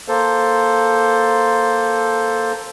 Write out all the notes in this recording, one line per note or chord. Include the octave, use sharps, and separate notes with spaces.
A#3 A4 C5